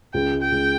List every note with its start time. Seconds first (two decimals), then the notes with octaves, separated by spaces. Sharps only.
0.14 C#2 G5
0.33 G#3
0.41 G5
0.52 C#2